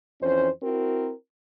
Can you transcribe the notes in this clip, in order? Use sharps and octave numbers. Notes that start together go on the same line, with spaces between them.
F2 E3 C#4 C5
C4 E4 F#4 A#4